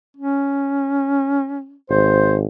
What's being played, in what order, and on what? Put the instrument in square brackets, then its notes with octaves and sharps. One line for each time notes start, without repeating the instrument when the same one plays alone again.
[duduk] C#4
[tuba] G#1 [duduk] C5